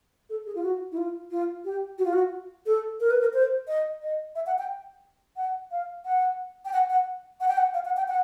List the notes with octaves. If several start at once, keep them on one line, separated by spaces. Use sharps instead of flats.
A4
G#4
F4
F#4
E4
F4
F4
G4
F#4
F4
F#4
A4
A#4
B4
A#4
C5
D#5
D#5
E5
F#5
G5
F#5
F5
F#5
G5
F#5
F#5
F#5
G5
F#5
F5
F#5
G5
F#5